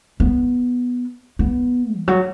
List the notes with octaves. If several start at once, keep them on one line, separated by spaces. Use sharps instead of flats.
B3
B3
E3
F#3